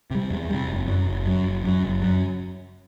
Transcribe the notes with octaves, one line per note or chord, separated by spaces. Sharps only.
C3 G3
E2
C3 G3
F#1
F#2 F#3
F#1
F#2 F#3
F#1
F#2 F#3
F#1
F#2 F#3